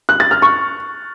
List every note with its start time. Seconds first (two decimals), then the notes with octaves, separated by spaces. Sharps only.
0.09 F#6
0.20 A6
0.31 F6
0.42 C#6